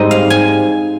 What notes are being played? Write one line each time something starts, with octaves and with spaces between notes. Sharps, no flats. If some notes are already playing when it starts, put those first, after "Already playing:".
Already playing: G#2 G3 C4 D#4 D#5
F5
G#5